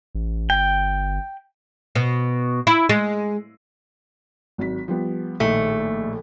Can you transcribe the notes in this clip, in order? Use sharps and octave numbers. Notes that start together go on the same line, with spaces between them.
A1
G1 G5
B2
E4
G#3
G#1 F#3 B6
F3 G3 B3
A#1 A2 D#3 A3